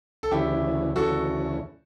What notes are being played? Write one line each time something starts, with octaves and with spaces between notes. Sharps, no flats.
A4
D2 C#3 E3 E4 G4
D2 C#3 E3 F#4 A4